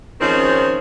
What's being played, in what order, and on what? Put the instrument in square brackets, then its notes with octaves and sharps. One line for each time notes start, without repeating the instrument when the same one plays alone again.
[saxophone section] D#3 F3 G#3 C4 C#4 D#4